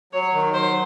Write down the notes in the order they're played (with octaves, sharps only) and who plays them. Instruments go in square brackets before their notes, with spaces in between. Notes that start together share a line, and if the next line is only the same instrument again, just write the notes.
[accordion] F#3 [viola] C#5
[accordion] D#3
[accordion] F#3 [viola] C5